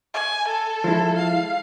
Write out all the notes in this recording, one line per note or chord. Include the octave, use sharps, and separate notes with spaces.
G#5
A4
F3 G#3 E4
F5